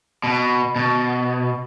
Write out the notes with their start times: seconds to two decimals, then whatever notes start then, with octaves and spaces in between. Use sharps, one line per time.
0.24 B2
0.76 B2